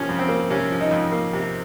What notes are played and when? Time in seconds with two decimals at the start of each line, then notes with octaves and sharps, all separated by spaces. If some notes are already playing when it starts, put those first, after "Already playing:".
Already playing: C3 F3 A#3 C#4
0.09 F2
0.19 C4
0.29 A#3
0.50 C3 C#4
0.70 F3
0.81 D#4
0.91 F2
1.12 A#3
1.33 C3